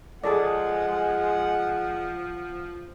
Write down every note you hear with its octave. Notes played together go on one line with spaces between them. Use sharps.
F3 G#3 G#4 A4 D5 F#5